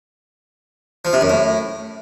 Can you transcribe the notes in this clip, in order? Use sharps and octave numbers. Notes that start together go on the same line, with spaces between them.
F3
C3
F#2
A2